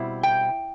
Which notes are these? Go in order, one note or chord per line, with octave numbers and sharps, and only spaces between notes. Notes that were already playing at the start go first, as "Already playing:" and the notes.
Already playing: B2 G3 C4 E4
G5